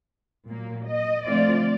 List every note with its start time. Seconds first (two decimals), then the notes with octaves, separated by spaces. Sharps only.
0.48 A#2 F#3 A#3
0.86 D#5
1.25 D3 F3 A3 C4 F4 D5